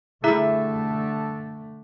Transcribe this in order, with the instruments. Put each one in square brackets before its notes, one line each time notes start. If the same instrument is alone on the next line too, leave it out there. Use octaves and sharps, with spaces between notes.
[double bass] D3 A3 [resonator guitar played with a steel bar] G3 E5 [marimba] E4 G#4 A#5 [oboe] A4